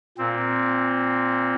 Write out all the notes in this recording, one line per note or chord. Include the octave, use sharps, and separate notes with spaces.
A#2 C4